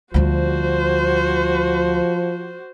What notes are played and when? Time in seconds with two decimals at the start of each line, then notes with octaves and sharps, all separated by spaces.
0.14 D2 F3 G3 F#4 C5